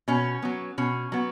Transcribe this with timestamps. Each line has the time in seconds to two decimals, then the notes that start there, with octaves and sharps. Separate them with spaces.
0.08 B2 C#4
0.42 F#3 B3
0.78 B2 C#4
1.12 F#3 B3